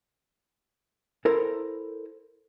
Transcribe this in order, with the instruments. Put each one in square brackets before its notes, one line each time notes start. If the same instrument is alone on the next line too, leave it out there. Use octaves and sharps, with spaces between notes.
[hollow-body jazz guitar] E4 A4 A#4 C5